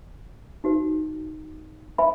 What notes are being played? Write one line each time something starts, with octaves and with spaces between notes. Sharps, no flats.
D#4 F#4 B4
B4 E5 G#5 B5